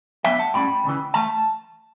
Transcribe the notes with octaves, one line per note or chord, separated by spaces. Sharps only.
D2 D3 F#3 B3 E5 G5
F#5 A5
A2 G3 C#4 G5 B5
D2 C#3 E3
E3 A3 A5